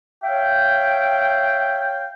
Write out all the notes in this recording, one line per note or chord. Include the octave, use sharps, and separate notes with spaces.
C#5 E5 F5 G5